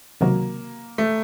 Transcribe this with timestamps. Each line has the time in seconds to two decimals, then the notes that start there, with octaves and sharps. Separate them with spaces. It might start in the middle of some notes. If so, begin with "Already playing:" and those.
0.21 C#2 C3 D#3 F#3 A#3
0.98 A3